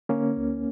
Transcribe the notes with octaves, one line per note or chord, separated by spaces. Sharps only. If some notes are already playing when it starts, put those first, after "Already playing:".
D3 A#3 C#4
D2